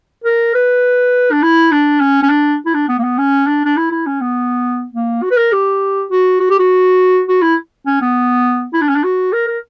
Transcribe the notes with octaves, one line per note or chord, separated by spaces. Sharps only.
A#4
B4
D4
E4
D4
C#4
C#4
D4
E4
D4
B3
A#3
B3
C#4
D4
D4
E4
E4
C#4
B3
A#3
F#4
B4
A#4
G4
F#4
F#4
G4
F#4
F#4
E4
C#4
B3
E4
D4
C#4
D4
F#4
A#4
A#4